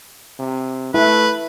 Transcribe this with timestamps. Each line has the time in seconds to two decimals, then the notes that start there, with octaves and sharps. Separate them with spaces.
0.40 C3
0.94 A3 E4 B4